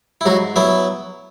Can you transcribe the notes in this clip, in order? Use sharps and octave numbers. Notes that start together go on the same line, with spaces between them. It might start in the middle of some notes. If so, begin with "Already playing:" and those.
E4
G#2 F#3 F#4
F#3 B3 E4 E5